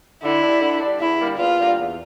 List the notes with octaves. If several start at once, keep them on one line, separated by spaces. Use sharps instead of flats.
D3 E4
G3 D4
D3
G3 D4
E2 E4
D3 G3 A#3
E2 F4
D3 G3 A#3
E2